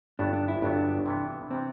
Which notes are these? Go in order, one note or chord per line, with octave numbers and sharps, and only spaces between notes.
G1 G2 F#3 B3 D4
D4
E4
G1 G2 F#3 B3 D4
C3 E3 B3
C3 E3 B3 C4